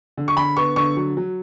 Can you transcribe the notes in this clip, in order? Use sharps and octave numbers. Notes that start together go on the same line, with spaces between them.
D3
C#6
D3 B5
B3 C#6
D3 C#6
F#3
F#3